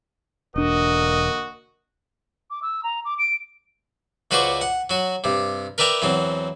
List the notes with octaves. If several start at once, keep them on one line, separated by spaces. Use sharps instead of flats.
E1 D3 A#3 D4 F#4 A#4 D#5
D6
E6
A#5
D6
D7
C#2 F#4 B4 C5 D5 C#6
F#5
F#3 F#4
G2 C3
A#4 B4 D5 E5 G5 A#5
E2 F#3 C4